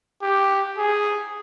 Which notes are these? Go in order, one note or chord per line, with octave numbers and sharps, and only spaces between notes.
G4
G#4